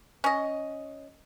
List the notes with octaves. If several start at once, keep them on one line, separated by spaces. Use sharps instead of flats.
C#4 D#5